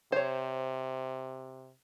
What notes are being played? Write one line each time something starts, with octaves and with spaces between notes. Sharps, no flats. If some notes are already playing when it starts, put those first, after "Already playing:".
C3 C5 C#5